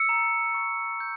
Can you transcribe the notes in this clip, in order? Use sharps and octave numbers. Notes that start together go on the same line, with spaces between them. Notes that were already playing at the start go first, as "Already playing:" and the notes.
Already playing: E6 C#7
A#5
C#6
G6